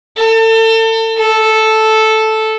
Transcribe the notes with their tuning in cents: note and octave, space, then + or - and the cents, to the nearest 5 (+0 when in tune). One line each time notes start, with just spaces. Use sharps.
A4 +35
A4 -5